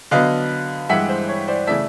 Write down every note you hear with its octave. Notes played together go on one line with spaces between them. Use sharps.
D3 F#3 B3 D#5 F5
G2 E3 G#3 E5 F#5
C5
C#5
C5 D5
C#3 E3 A3 D5 E5